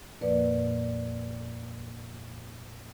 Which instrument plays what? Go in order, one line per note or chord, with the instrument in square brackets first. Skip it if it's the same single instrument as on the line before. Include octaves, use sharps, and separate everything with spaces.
[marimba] F2 A#2 F3 A#3 B4 D5